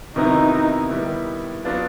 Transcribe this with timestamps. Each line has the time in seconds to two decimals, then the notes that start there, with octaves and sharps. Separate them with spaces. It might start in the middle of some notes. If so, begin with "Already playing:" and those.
0.16 C3 D#3 F#3 B3 D#4 E4
0.90 D#3 G3 B3 E4
1.65 F#3 B3 D4 F4